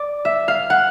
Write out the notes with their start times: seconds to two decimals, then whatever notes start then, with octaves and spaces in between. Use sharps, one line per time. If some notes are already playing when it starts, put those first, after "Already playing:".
Already playing: D5
0.25 E5
0.48 F5
0.70 F#5